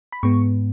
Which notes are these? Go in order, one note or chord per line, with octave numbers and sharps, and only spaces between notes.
B5
G#2 G#3 B3 C#6